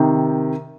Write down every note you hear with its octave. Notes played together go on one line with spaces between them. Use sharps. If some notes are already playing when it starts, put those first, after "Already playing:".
Already playing: C3 D#3